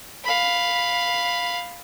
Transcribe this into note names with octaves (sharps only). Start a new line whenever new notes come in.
F5 B5